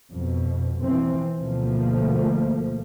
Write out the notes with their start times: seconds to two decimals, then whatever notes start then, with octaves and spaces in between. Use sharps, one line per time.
0.12 F2 B2
0.81 E3 F3 C4
1.40 D2 B2 F3 A3 A#3